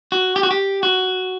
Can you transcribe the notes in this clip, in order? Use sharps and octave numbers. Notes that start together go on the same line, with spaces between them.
F#4
G4
F#4
G4
F#4